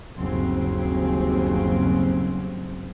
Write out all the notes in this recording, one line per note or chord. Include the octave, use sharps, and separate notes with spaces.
G1 D#2 C#3 F#3 C4